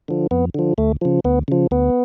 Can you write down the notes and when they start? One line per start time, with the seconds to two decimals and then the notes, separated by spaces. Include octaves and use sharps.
0.08 D3 F3
0.31 F2 B3
0.54 D3 F3
0.78 D2 A3
1.01 C#3 F3
1.25 D2 B3
1.48 C#3 F3
1.71 D2 B3